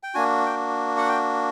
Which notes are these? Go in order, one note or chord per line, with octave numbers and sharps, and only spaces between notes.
G5
A#3 D4 F#4 G#5
G5
F#5
G5